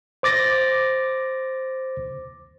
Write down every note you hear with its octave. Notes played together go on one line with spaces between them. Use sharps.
C5 D6 A6 A#6